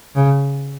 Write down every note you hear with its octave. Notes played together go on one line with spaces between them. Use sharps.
C#3